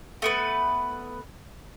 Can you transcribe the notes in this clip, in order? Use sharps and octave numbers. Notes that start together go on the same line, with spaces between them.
A3 B3 B4